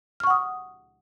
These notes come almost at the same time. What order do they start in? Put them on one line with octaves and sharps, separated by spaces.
F6 C#6 F#5 D#6